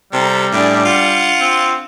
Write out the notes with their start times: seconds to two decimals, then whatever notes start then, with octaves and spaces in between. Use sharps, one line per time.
0.13 C3 G3 A4 A#5
0.52 A2 D4 G#4
0.85 F4 F#5
1.41 C4